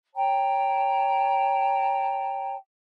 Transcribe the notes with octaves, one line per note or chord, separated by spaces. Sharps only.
C#5 G5 A5 A#5